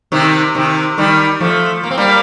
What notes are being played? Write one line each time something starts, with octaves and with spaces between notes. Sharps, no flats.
C3 D#3
C3 D#3
D#3 G3
F3 A3
A#3
C4
G3 A#3